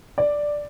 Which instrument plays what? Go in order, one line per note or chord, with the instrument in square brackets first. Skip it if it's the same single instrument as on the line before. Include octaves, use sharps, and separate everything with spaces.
[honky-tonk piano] D5